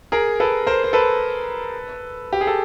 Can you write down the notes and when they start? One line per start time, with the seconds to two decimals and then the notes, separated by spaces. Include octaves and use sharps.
0.12 G#4 A#4
0.40 A4 B4
0.67 A#4 C5
0.84 C5
0.93 A4 B4
2.33 G4
2.41 G#4
2.47 A4